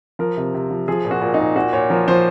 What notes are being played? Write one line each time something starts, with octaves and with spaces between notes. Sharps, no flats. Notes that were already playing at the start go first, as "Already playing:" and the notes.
F3 A#4
C3
C3
F3
F3 G#4
A#2
F#4
A#2
D#4
A#2
A#2 F#4
A#2 C#5
F3 A#4
F3 C5